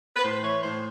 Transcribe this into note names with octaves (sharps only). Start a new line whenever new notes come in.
B4
A2 C5
E3 C#5
A2 C5